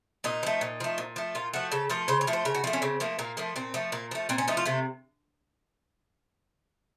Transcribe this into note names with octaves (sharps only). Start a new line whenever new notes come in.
A#2 D#4
F3 A3
A#2
F3 A3
A#2
F3 A3
A#2 F4
F3 A3 F#4
C#3 A4
F3 A3 A#4
C#3 C5
C#5
F3 A3
C5
C#3 A#4
F#4
F3 A3 F4
C#4
C#3 C4
F3 A3 A#3
A#2 A#3
F3 A3 A#3
A#2 C4
F3 A3
A#2 A#3
F3 A3
A#2 C4
C#4
F3 A3 D#4
F4
C3 A3